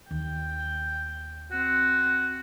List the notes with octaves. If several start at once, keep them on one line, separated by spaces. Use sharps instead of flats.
D#2 G5
C4 F#4